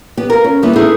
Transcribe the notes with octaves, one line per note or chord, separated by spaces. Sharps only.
B3 G4
F4 A#4
C#4
D#3 G3 A#3 B3 E4
D#4 E4 G#4 A4 B4